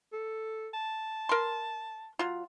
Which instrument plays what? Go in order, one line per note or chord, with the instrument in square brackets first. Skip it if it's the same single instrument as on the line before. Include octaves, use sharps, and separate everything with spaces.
[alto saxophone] A4
A5
[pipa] A#4 C6
F#3 F4